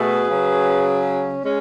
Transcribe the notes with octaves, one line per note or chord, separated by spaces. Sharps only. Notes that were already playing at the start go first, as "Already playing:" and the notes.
Already playing: B2 A3 G#4 B4
C#3 F#3 C#4
G#3 C#4